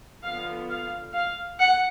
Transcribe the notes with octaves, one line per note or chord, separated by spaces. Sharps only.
D3 F3 B3 F5
F5
F5
F#5